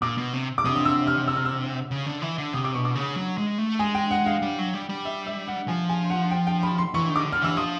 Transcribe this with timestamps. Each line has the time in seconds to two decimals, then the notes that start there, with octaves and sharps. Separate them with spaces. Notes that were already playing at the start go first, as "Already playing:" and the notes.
0.02 A#2 D6
0.18 B2
0.33 C3
0.58 D6
0.65 C3 D#6
0.76 D#6
0.85 E6
1.07 F6
1.28 E6
1.36 F6
1.45 E6
1.91 C#3
2.06 D3
2.22 E3
2.38 D3
2.53 C3 D#6
2.65 D6
2.75 B2 C#6
2.85 D6
2.95 C#3
3.16 F#3
3.38 G#3
3.58 A3
3.79 G#3 G#5
3.95 G5
4.11 F#5
4.26 F5
4.42 G3
4.59 F#3
4.74 G3
4.89 G3
5.05 E5
5.26 E5
5.48 F#5
5.68 F3 G#5
5.89 G#5
6.10 F#5
6.31 G5
6.47 G5
6.63 B5
6.78 C6
6.94 E3 C#6
7.10 D#3
7.16 D6
7.25 D3
7.32 F6
7.42 E3 E6
7.57 F3 D#6